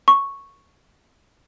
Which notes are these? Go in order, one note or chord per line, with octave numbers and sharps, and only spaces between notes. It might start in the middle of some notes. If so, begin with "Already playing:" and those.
C#6